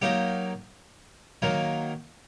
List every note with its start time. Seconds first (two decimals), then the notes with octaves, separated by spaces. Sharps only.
0.02 F#3 A#3 D#4 G4
1.42 D#3 F#3 A#3